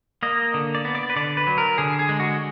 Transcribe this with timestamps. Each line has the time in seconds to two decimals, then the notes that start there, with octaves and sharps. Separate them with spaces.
0.23 A#3 D#5
0.54 D3
0.75 D5
0.85 B3
0.95 D5
1.10 B4
1.16 D3 D5
1.37 B4
1.47 F#3
1.58 A#4
1.78 D3 G#4
1.99 G#4
2.09 G#3
2.20 F#4